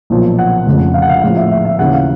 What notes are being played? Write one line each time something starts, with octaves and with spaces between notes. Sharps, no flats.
B1 A#2 F3
F#5
F1 F2 C#3
F5
F#5
F5
A#1 A2 F3 F5
E5
E5
E5
D#2 C#3 E3 F#5
F5